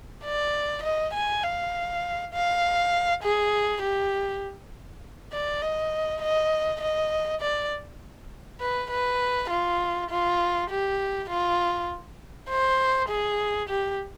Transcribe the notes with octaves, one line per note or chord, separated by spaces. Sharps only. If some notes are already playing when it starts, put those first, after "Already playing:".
D5
D#5
G#5
F5
F5
G#4
G4
D5
D#5
D#5
D#5
D5
B4
B4
F4
F4
G4
F4
C5
G#4
G4